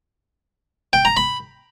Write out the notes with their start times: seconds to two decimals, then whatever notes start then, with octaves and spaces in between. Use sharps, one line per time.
0.93 G5
1.05 A#5
1.17 B5